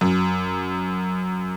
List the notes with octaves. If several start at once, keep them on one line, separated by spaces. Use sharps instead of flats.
F#2